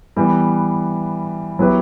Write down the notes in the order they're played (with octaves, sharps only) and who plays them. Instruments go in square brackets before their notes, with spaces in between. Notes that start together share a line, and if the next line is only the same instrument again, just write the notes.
[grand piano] E3 G3 B3
F#3 B3 E4 G4 B4